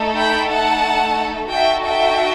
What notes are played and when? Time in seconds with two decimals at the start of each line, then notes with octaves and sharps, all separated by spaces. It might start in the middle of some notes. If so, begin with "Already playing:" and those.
Already playing: A3 D#4 A4
0.18 G5 B5
0.51 F#5 A5
1.53 D#4 F#4 A4 E5 G5
1.86 E5 G5